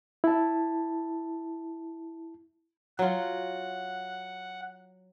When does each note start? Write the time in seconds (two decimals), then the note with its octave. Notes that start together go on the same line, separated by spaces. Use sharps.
0.24 E4 A5
2.99 F#3 F4 F#5